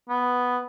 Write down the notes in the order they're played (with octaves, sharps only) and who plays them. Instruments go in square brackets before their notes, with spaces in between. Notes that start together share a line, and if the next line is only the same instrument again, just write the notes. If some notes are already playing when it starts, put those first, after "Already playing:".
[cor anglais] B3